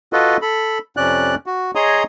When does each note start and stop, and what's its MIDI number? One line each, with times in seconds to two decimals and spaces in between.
0.13 0.37 65
0.13 0.37 66
0.13 0.37 69
0.13 0.37 71
0.13 0.37 75
0.42 0.78 69
0.42 0.78 83
0.97 1.35 41
0.97 1.35 48
0.97 1.35 61
0.97 1.35 74
0.97 1.35 90
1.46 1.71 66
1.75 2.03 68
1.75 2.03 73
1.75 2.03 75
1.75 2.03 82
1.75 2.03 84
1.75 2.03 87